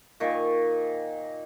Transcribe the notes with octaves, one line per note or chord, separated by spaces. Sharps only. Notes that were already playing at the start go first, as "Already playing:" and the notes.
A#2 D#3 C#6